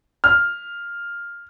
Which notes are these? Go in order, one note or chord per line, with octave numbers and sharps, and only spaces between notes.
F6